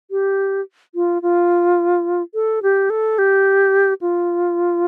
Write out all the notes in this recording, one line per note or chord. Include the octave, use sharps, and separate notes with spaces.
G4
F4
F4
A4
G4
A4
G4
F4